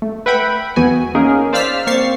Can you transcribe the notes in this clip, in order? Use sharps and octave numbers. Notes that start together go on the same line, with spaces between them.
A3
B4 E5 F#5 G5 B5
E2 B3 F#4 G#5
A#3 C#4 D#4 G#4 A#4
C5 D5 F5 E6 F6 B6
A#3 C4 C#6 A6 C7